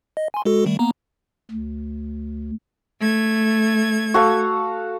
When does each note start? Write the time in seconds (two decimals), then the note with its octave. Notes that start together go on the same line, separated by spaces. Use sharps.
0.17 D#5
0.34 G#5 C6
0.45 G#3 F#4 A4
0.66 D#3 G3 A3
0.79 A#3 B3 A#5
1.51 D2
2.99 A3 G#6
4.14 F#4 A4 F5